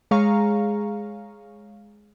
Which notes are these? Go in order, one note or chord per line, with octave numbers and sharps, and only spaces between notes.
G#3 G#4 C#5 F5 A#5 C#6